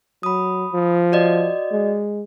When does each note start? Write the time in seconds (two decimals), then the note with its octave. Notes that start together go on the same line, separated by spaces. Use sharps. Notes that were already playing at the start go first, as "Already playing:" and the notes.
0.23 F#3 B5 D#6
0.73 F3
1.12 F#4 D5 D#5
1.72 G#3